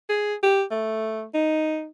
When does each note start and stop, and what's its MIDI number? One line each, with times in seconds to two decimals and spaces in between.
0.09 0.34 68
0.43 0.63 67
0.71 1.24 57
1.34 1.87 63